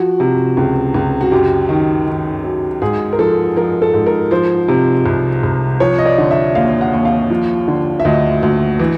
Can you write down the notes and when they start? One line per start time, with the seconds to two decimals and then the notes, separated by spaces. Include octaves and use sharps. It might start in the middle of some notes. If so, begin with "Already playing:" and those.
Already playing: F3 F#4
0.20 C3
0.57 C#2
0.94 C#2
1.21 F#4
1.32 F#2 G4
1.69 D#3
2.07 D#3
2.44 F#2
2.82 G#2 G#4
3.13 A#4
3.19 F3 A4
3.56 F3 A#4
3.82 A4
3.93 G#2
4.06 A#4
4.31 F3 C5
4.68 C3
5.06 C2
5.43 C2
5.80 F3 C#5
5.98 D#5
6.05 D5
6.18 D3
6.31 E5
6.55 D#2 F5
6.81 F#5
6.93 D#2
7.05 F5
7.30 F3
7.68 D3
8.00 E5
8.05 D2 D#5
8.43 D2
8.79 E3